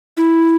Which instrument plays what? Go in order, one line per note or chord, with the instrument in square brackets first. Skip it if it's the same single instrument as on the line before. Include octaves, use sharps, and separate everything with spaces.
[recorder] E4